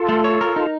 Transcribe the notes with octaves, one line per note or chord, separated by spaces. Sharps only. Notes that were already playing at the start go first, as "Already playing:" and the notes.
Already playing: F4 A4
A3
C#5
A#4
D#4